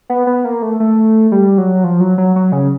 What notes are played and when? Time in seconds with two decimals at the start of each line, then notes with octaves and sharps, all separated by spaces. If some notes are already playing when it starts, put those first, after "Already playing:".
0.10 B3
0.27 B3
0.45 A#3
0.62 A3
0.80 A3
1.32 G3
1.58 F#3
1.84 F3
2.00 F#3
2.18 F#3
2.36 F#3
2.52 C#3